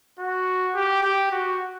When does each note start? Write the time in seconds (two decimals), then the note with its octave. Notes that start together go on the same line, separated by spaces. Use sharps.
0.19 F#4
0.74 G4
1.03 G4
1.31 F#4